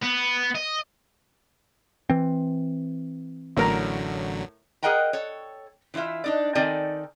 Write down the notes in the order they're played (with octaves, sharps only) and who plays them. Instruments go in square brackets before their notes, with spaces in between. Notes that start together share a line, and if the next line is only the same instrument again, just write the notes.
[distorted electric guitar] B3
D#5
[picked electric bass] E3 C4
[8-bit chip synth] A1 D3 F#3 [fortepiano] A2 A#4 A#5
[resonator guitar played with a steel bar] G#4 A#4 D#5 F#5 G5 A#5
A4 C#5
E3 C4 E4 F4 E5
D4 D#4 D5
D#3 C4 D#4 A4 D5 G#5